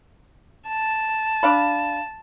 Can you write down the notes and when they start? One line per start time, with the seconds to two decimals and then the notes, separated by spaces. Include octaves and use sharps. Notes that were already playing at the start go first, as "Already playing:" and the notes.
0.68 A5
1.43 D4 F5 B5